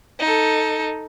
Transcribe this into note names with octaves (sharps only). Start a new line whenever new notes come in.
D#4 A4